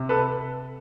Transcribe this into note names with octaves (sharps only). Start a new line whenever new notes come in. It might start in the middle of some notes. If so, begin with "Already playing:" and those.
Already playing: C3
A4 B4